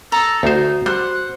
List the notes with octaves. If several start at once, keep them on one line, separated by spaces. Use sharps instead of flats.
A4 A#5 D#6
D2 D#4 F#4 C5
G3 C5 F#5